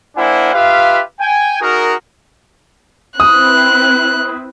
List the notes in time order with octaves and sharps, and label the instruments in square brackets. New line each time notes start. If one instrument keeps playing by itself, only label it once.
[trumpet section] A#3 D4 E4 C5 F#5 G#5
F4 G4 B4 E5 F5
G5 G#5
D#4 F#4 G#4 A#4
[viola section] C4 E4 B4 [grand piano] D#6 [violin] F#6